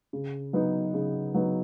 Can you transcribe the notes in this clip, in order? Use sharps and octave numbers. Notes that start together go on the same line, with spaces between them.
C#3
F#3 B3 D#4
C#3
F#3 B3 D#4